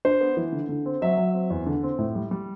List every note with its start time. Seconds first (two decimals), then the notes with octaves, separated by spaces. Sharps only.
0.05 D4 C5
0.21 B3
0.37 E3
0.52 D3
0.69 D3
0.86 C4
1.02 F#3 E5
1.17 F#3
1.34 C4
1.50 E2
1.67 D3
1.83 C4
1.99 A2
2.15 G3
2.31 G3